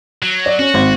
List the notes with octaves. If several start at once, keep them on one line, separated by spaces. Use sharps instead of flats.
F#3
D5
C#4 F#4
G#1